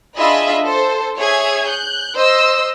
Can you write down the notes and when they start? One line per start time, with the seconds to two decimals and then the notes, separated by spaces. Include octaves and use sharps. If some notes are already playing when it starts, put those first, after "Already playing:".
0.16 D4 F4 G#4 D#5 E5 B5
0.62 A4 C5
1.17 G#4 C#5 E5 G#6
1.67 F#6 G6
2.16 C5 D#5 E6